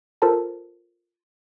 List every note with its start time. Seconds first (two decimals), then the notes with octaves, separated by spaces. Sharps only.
0.22 F4 A4 A#4 C5 A5 A#5